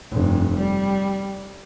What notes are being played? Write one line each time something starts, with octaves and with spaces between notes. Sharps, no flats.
F1 G2
G3